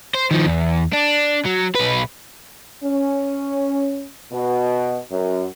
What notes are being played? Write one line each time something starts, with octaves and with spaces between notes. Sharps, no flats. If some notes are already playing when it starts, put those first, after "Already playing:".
C5
D#3 F3
E2
D4
F#3
B1 B4
C#4
B2
F#2